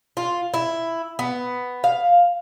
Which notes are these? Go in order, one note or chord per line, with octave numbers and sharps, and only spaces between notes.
F4
E4
B3
F5